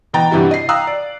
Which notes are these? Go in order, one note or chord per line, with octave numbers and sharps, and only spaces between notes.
B2 E3 G5 A#5 A6
G2 C3 E3 E4 F#4
D#5 C7
F5 G5 A#5 D#6 E6 F#6
D5